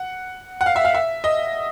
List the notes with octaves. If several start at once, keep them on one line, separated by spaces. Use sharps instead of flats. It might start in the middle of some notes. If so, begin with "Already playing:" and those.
Already playing: F#5
F#5
F5
E5
F5
E5
D#5